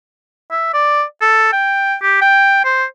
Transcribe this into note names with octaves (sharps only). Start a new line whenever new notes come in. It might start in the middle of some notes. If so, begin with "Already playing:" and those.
E5
D5
A4
G5
G4
G5
C5